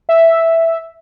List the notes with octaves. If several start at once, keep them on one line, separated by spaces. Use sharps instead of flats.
E5